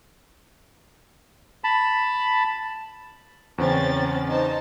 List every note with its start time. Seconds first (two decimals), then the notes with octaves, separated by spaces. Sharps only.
1.64 A5 B5
3.58 E2 C#3 C4 C#4 A6
4.28 D#4 C5 A5